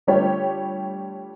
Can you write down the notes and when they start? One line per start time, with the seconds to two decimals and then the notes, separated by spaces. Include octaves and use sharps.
0.07 D3 G3 A3 F4 G4 C#5